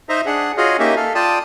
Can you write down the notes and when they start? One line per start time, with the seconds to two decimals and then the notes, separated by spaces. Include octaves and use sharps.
0.09 D#4 C5 D#5 E5 A#5
0.26 D4 G#4 F#5
0.57 F4 F#4 G#4 C#5 D#5 F5
0.79 A#3 C#4 D#4 G4 D#5 E5
0.96 A4 F5
1.15 F4 D5 G5 A5 D#6